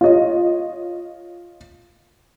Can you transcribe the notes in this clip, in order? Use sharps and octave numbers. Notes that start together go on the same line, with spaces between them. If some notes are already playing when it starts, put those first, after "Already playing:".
F4 C#5 D#5